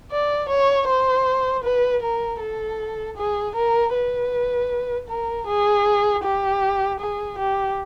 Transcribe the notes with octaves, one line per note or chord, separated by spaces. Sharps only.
D5
C#5
C5
B4
A#4
A4
G#4
A#4
B4
A#4
G#4
G4
G#4
G4